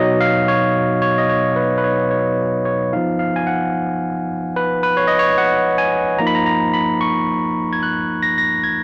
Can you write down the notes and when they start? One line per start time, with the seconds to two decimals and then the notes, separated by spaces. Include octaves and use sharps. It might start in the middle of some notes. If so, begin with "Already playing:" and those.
Already playing: B2 F#3 B3 D#4 C#5 D#5
0.21 F5
0.48 C#5
1.02 C#5
1.18 D#5
1.29 C#5
1.56 B4
1.78 B4
1.84 C#5
2.11 C#5
2.65 C#5
2.93 F3 B3 D#4 F5
3.19 F5
3.36 G#5
3.47 F#5
4.56 B4
4.83 B4
4.97 C#5
5.07 D#5
5.19 C#5
5.38 F#5
5.78 G#5
6.18 F3 A#3 D#4 A#5
6.27 B5
6.35 A#5
6.46 A#5
6.74 B5
7.01 C#6
7.73 G#6
7.83 F#6
8.23 A#6
8.38 A#6
8.64 G#6